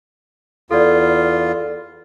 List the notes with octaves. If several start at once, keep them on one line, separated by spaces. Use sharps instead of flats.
E2 F4 A4 D5